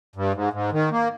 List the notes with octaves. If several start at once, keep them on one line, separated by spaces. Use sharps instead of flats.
G2
G#2
G#2
D#3
A#3